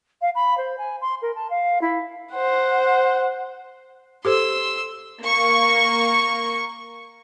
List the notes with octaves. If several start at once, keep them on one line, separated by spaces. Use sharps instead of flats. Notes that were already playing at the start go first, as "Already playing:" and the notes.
F5
B5
C5
G#5
C6
A#4
A5
F5
E4
C5 F#5
G4 A4 C5 C6 E6
A#3 C#6